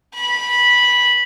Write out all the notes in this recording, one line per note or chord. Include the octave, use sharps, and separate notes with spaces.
B5